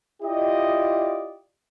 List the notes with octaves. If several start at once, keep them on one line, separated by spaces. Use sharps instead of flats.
E4 F4 G4 D5 D#5